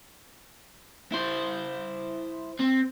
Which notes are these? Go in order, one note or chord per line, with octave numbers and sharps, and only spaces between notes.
E4 C5
C4